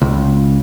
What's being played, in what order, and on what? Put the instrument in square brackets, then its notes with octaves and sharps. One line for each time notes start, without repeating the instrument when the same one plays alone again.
[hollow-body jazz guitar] C#2